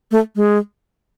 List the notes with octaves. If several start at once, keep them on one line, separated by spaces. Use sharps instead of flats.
A3
G#3